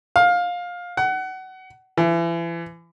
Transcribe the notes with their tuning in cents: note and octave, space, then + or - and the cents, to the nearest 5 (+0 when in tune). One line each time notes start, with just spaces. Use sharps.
F5 +20
F#5 +25
E3 +35